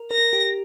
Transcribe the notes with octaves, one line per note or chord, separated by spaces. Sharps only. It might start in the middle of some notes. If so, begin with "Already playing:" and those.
Already playing: A#4
A#4 A#6
G4